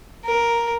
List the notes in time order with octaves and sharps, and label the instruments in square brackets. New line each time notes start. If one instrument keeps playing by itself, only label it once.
[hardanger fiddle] A#4